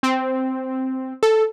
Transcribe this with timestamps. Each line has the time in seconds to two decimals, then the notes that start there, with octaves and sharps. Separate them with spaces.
0.03 C4
1.23 A4